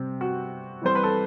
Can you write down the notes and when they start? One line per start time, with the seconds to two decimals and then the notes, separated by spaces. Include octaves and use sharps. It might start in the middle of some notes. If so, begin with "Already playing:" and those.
Already playing: C3 G3 C4
0.21 F#4
0.82 E3 G3 C4 C5
0.95 B4
1.03 A4